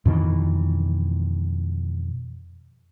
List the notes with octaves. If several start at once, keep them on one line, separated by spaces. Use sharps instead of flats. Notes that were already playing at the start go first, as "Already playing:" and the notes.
F2 B2 D#3 E3